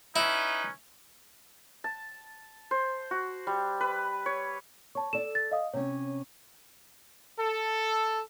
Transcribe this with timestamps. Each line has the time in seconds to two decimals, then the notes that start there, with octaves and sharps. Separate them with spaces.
0.16 C#4 D#4 E4 B4
1.84 A5
2.71 C5
3.11 F#4
3.47 G3
3.81 B4
4.26 C#5
4.95 C#5 A5 C#6
5.13 A4 D5 E7
5.35 A6
5.51 D#5 F5 D#6
5.73 C3 C#4 C#5
7.40 A4